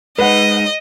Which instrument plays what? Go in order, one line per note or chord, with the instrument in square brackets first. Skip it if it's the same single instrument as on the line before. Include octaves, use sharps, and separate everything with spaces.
[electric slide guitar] G#3 D#4 [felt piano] B4 F#5 [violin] D#5